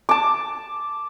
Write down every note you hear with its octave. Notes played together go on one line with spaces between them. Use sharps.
A5 D6